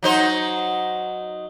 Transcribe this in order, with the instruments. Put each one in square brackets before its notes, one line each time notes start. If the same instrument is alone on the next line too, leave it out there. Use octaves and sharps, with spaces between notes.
[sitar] F#3 D#4 C5